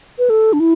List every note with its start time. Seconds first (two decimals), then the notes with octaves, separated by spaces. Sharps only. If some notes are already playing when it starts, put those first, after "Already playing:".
0.19 B4
0.30 A4
0.53 D4
0.60 E4